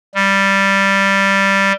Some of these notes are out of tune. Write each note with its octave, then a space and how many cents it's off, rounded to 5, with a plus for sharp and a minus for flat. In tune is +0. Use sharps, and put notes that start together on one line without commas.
G3 +0